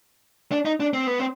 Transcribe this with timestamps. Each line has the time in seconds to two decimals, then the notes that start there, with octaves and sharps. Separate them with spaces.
0.52 D4
0.65 D#4
0.80 D4
0.93 C4
1.07 B3
1.19 C4